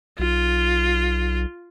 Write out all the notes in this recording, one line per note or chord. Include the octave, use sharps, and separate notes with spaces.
B1 F4